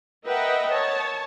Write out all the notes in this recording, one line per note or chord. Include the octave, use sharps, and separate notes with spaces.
A#4 B4 D#5 E5 F#5 G5
C#5 A5